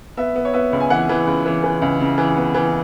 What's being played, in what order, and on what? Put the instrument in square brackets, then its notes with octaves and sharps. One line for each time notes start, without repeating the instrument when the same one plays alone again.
[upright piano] B3 E5
B3
C#5
B3 E5
C#2
G#5
E3 F#5
E3
C#2
E3
E3
C#2
C#3
E3
B3
E3